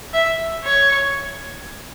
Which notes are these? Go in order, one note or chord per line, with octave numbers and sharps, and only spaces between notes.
E5
C#5